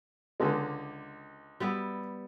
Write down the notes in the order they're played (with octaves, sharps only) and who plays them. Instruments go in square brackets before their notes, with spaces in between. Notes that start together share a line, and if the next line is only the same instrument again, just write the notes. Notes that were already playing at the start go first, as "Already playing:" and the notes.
[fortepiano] C#2 D3 G#3
[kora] G3 B3 E4